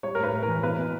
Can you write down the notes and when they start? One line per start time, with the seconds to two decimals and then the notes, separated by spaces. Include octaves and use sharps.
0.03 G3 C#5
0.15 A#4
0.18 A2
0.23 B4
0.33 A2
0.43 A#4
0.48 E3
0.63 B2 B4
0.78 B2